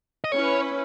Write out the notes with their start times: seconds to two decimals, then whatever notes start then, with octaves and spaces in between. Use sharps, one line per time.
0.24 D#5
0.32 C#4 E4 B4 C#5